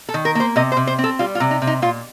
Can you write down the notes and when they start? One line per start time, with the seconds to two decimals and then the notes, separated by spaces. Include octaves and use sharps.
0.09 A4
0.14 D#3
0.25 A#4
0.35 A#3 C5
0.56 C3 D#5
0.72 C5
0.77 C3
0.87 C5
0.98 C4
1.04 A4
1.19 G3 F4
1.35 F4
1.40 C3
1.51 D#4
1.62 C3
1.67 D#4
1.82 A#2 F4